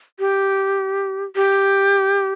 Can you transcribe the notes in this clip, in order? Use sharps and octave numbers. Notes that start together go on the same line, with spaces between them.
G4
G4